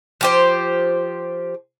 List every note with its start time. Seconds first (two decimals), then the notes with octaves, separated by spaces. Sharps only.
0.21 F3 G4 C5